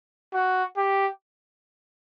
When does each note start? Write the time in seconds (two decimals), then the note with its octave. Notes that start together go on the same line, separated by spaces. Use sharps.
0.34 F#4
0.77 G4